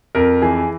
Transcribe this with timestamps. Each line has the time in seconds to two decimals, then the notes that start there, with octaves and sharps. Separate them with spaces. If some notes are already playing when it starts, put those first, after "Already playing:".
0.15 F2 A#4
0.42 E3 G#4